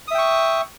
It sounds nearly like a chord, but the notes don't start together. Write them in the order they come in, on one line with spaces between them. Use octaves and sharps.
D#6 E5 G5 C#6